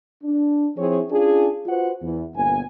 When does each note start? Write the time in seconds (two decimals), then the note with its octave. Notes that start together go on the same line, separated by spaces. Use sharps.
0.23 D4
0.77 F3 C4 E4 G#4 C#5
1.09 C#4 D4 F4 G#4
1.66 F4 F#4 B4 C5 F#5
2.03 E2 E3
2.35 G1 A#2 B3 G#5